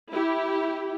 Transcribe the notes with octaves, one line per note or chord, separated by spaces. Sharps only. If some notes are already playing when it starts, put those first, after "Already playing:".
E4 G4